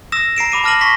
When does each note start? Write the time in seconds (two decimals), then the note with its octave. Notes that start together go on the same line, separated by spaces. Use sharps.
0.12 D#6 E6 A#6 E7
0.36 A#5 C7 D7 E7
0.52 B5 D6 D#7
0.64 A5 D6 F6 A#6 D#7 F#7
0.81 C#6 A#6 B6